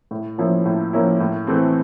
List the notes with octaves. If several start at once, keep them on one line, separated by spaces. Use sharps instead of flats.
A2
F3 A#3 C#4 E4
A2
F3 A#3 C#4 E4
A2
E3 A3 C4